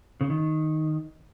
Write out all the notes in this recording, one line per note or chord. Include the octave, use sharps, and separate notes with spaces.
C#3
D#3